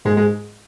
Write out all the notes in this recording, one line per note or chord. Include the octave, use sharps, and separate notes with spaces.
G#2 G#3
G#3